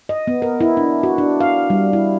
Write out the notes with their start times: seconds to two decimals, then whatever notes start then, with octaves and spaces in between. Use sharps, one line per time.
0.09 D#5
0.27 B3
0.42 A#4
0.61 E4
0.77 D4
1.03 F#4
1.18 D4
1.40 F5
1.70 G3
1.93 E4